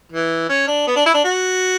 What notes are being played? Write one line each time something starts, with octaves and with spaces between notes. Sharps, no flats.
E3
C#4
D4
B3
D4
E4
D4
F#4